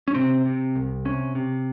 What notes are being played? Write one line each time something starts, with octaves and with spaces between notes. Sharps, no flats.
C#4
C3 C4
C3
C2
C3 C#4
C3